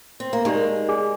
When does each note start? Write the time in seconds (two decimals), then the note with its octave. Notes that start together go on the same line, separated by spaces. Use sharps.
0.20 C4
0.33 A#3
0.45 G#3 D#4 G4 A#4 D5
0.89 G#4 D5 G#5